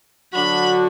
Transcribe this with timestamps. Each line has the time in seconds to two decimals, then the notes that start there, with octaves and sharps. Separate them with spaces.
0.34 D3 F#3 D4 F#4 B5